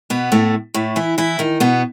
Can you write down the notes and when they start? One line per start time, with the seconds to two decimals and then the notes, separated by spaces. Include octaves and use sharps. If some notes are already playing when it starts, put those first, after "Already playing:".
0.10 B2 B3
0.32 A2 A3
0.74 A2 A3
0.96 E3 E4
1.18 E3 E4
1.39 D#3 D#4
1.60 B2 B3